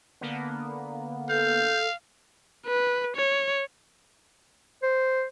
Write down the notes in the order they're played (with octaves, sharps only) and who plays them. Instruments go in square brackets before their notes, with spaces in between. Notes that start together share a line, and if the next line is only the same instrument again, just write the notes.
[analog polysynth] D3 A#3 B3
[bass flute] A4 [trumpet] F5 [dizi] G6
[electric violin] B4
C#5
[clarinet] C5